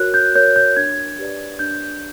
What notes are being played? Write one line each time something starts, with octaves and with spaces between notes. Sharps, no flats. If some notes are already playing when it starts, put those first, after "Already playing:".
Already playing: F#4 A#4 C#5 F#6
G6
A#4 C#5 G6
G6
D4 G#6
G4 B4 D5
D4 G6